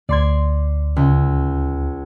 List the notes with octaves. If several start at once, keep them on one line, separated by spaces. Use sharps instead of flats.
D2 D5 C6 G#6
C#2